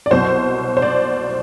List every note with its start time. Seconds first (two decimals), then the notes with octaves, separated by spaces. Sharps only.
0.06 D5
0.11 C2 B2 F#3 C5
0.77 C5
0.82 D5